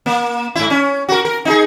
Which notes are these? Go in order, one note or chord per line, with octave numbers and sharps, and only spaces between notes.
A#3
G#2 E4
C#4
F#4 A#4
A#4
D#4 E4 G#4